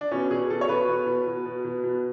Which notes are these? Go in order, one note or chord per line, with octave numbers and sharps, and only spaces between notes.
D4
B2 C#4
B2 G#4
B2 A4
C#5
B2 B4
B2
B2
B2
B2
B2
B2